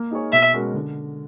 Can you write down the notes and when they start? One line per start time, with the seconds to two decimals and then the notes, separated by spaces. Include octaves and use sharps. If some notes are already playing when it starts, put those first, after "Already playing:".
Already playing: A#3
0.11 D#4 G#4 C#5
0.32 B2 E5
0.54 G#3 C#4 F#4 A#4
0.74 D3